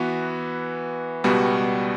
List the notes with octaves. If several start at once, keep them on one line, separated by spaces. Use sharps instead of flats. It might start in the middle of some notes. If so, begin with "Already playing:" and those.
Already playing: E3 B3 F#4 B4
C#2 B2 G3 B3 F#4